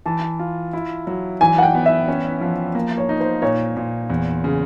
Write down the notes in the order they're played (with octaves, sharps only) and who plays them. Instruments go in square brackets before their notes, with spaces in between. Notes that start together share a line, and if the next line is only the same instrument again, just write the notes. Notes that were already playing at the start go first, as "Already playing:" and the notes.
[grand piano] E3 [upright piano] A5
[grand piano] F4
E4
F#3
[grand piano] E3 [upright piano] G#5
[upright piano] F#5
G5
[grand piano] B3
[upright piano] E5
[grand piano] C#4
F3
A#3
[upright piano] C#5
[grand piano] D#4
[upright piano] C5
[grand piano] A#2 [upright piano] C#5
[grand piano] A#2
E2
C#3